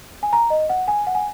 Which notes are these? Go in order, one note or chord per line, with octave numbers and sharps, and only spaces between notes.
G#5
A#5
D#5
F#5
G#5
F#5
G#5